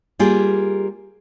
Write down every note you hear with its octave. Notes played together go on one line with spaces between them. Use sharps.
G3 A#3 F4 G4 G#4